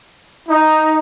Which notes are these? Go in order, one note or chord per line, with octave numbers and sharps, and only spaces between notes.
D#4